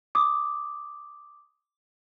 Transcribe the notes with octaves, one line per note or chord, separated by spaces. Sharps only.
D6 D#6